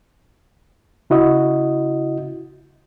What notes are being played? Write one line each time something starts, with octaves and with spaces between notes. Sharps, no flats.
C#3 E4 F#4 D#5